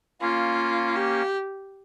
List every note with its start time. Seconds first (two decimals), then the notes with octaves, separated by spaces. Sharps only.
0.21 A#3 C#4 F4
0.96 G4